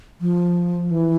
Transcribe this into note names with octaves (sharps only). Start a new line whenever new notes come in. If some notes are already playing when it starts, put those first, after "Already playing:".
F3
E3